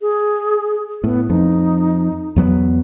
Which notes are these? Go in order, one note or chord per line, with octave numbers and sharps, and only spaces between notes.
G#4
A2 B3
F2 D#4
E2 F#3 B3